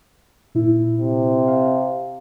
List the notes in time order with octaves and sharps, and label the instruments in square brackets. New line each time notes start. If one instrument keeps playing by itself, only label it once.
[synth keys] A#2 E4
[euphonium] C3
[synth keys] F5